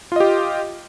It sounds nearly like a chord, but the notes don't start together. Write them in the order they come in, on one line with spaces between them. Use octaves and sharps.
F4 D#5 G4